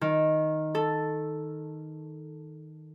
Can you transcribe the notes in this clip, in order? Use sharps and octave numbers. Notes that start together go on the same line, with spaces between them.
D#3
A4